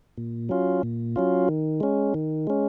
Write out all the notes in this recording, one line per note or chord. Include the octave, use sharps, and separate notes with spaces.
A#2
F#3 C#4 F4
A#2
F#3 C#4 F4
D#3
G#3 C#4
D#3
G#3 C#4